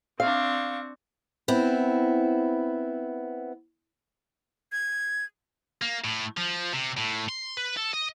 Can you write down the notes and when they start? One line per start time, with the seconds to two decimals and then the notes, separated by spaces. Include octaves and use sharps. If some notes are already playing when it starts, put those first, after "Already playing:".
0.20 C4 D4 F5 C#6
1.48 B3 C4 E4
4.72 G#6
5.82 A#3
6.04 A2
6.37 F3
6.73 C3
6.97 A2
7.29 C6
7.57 B4
7.77 A4
7.94 D#5